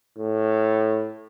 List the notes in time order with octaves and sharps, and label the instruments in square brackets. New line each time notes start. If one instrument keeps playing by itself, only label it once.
[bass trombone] A2